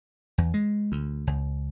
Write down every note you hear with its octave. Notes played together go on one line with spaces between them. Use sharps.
E2
G#3
D2
C#2